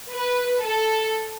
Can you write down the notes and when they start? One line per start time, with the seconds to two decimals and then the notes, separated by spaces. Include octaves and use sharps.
0.13 B4
0.64 A4